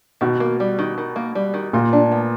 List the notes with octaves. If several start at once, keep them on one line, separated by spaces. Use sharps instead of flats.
B2 D#3
A#3
G3
D#3
D#3
A#3
G3
D#3
A#2 F4
D4
B3